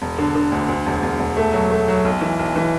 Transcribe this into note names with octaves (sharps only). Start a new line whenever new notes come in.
E1
D3
D3
D2
D2
E1
E1
E1
A3
F#3
A3
F#3
B1
E3
B1
E3